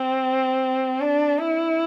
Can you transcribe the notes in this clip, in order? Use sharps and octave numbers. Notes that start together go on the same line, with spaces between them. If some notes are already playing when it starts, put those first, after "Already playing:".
Already playing: C4
D4
E4